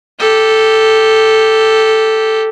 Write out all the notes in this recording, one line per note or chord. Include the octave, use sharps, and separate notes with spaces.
G4 A4